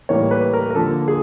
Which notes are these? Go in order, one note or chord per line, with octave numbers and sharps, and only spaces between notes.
A2 E3 G3 A#3 C#5
B4
A#4
A#4
D3 F3 A#3 A4
G#4